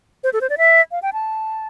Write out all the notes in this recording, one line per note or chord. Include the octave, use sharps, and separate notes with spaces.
C5
A4
C5
D5
E5
F5
G5
A5